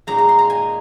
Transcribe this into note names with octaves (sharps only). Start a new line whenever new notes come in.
A#2 G#3 D#4 A#5
A#5
C6
A#5
G#5